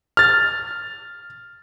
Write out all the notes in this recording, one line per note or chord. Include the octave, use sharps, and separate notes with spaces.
F6 A6